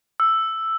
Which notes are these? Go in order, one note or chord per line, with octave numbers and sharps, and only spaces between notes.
E6